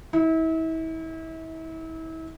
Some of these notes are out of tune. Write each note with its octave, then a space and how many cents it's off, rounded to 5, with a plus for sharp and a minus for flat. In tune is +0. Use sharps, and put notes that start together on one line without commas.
E4 -35